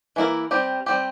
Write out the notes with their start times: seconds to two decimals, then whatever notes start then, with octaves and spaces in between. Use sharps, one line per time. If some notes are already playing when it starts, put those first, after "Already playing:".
0.16 E3 A#3 E4 A#4
0.51 G3 C4 G4
0.86 G3 C4 G4